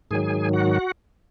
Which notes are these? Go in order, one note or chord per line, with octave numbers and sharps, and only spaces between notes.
G#2 D#3 F#3 G#4 G#5
F#4 F#5